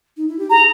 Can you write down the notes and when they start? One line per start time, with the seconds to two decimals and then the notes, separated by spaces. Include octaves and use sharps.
0.17 D#4
0.28 E4
0.39 G4
0.50 G#4 A#5